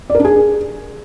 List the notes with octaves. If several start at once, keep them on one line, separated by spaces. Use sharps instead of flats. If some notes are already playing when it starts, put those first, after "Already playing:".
D5
A#4
D4
G#4